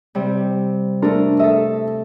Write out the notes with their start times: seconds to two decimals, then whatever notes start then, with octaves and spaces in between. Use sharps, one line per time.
0.15 C3 G3
1.02 A3 D4 A#4
1.39 A4 D#5 E5